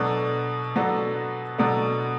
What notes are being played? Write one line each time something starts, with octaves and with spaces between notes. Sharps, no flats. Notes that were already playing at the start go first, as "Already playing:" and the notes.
Already playing: B2 F#3 B3 D4 A4
B2 F#3 B3 D4 A4
B2 F#3 B3 D4 A4